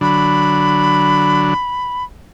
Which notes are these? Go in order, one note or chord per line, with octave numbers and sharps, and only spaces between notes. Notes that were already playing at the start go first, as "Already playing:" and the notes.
D3 F#3 D4 B5